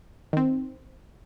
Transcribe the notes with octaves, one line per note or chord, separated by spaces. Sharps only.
D#3 C4